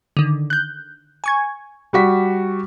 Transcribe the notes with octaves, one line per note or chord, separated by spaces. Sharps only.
D3 D#3
F#6 G6
G#5 C#6 G#6
G3 F#4 B6